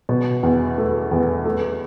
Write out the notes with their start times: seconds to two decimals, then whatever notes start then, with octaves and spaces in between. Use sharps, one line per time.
0.09 B2
0.43 E2
0.78 A3
1.11 E2
1.45 A3